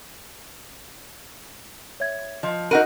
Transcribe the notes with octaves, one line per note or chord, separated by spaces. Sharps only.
C#5 E5 G#6
F3 D#5
D#4 F#4 A#4 D#5 F#5 D#7